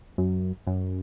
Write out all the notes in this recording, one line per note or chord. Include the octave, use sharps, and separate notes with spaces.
F#2
F#2